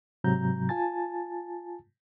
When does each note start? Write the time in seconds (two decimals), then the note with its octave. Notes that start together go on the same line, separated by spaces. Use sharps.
0.24 G#2 C3 F#3 A#5 G6
0.69 F4 G#5 A5 A6